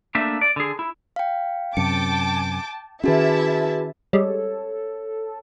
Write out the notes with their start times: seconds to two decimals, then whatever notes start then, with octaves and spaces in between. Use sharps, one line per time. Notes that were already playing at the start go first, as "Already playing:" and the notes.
0.15 A3 A#3 D4 E5
0.41 D5
0.56 D3 G#4
0.79 E4
1.16 F5 G5
1.77 F#2 C3 G5 A5 D6 C#7
3.04 D#3 C#4 E4 F#4 G#4 B4 E5 A5
4.13 G3 G#3 A4 C#5